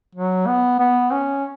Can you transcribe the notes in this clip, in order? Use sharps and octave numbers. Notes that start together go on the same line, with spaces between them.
F#3
B3
B3
C#4